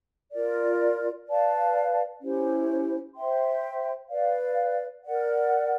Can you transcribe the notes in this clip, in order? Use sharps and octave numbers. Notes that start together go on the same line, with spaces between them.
F4 A#4 D5
B4 D5 F5 A5
C#4 E4 G4 C5
C5 E5 G5 C6
B4 D5 F5
A#4 D5 F#5